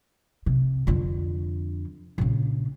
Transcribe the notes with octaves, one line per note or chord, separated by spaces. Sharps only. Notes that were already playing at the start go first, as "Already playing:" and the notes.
C3
F2 D3
A#1 C#3